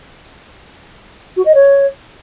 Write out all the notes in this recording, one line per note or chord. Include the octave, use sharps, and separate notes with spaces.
F#4
D#5
C#5